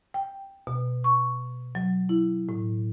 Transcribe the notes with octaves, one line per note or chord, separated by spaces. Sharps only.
G5
B2
C#6
F#3
E4
A2